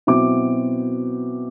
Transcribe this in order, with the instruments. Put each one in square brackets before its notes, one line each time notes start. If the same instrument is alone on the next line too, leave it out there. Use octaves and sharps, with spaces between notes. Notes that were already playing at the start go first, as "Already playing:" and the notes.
[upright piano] B2 F#3 C4 E4 D6